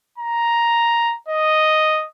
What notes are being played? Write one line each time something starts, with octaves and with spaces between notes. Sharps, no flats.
A#5
D#5